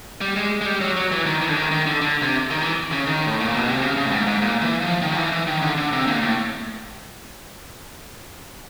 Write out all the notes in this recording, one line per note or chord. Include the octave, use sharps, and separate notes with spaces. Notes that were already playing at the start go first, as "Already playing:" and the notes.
G3
G#3
G#3
G3
F#3
F#3
E3
D#3
E3
D3
D#3
D#3
D3
D3
C3
D#3
E3
C#3
D#3
A2
A#2
B2
C3
C#3
C#3
A2
G#2
G#2
A#2
E3
F3
D#3
F3
E3
E3
D#3
D3
D3
C3
A#2
A2